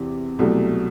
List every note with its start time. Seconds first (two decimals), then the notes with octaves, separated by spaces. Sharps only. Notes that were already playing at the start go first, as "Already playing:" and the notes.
Already playing: E2 C3 E3 C4
0.39 C2 B2 F#3 A3